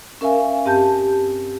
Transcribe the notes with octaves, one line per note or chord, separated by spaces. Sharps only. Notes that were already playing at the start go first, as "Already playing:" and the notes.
C#4 A#4 E5 F5 G#5
G2 C4 G4 A5 G6